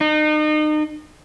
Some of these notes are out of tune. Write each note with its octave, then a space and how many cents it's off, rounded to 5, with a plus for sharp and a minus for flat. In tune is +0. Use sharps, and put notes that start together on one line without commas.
D#4 -35